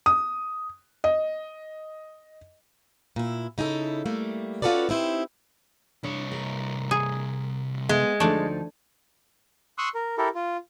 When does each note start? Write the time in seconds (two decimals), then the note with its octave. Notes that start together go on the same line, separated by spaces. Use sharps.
0.06 D#6
1.04 D#5
3.16 A#2 E4
3.58 C#3 D#4 E4 G#4 A4
4.06 G3 A3 A#3
4.62 C#4 F4 F#4 A4 B4 D5
4.89 C4 D#4 E4 G4 C5
6.03 C2 D4 C#5
6.32 A#4
6.91 G#4
7.89 G#3 B3
8.20 D2 F3 A3 D4 D#4 D5
9.78 C6 C#6 D#6 E6 F#6
9.95 A#4
10.18 E4 G4 A4 A#4
10.35 F4